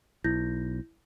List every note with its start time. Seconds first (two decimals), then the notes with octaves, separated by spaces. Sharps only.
0.24 B1 E4 G6 A#6